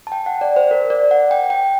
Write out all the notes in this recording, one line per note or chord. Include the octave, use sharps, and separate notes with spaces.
A5
G5
F#5
D5
C5
A#4
D5
F#5
G5
G5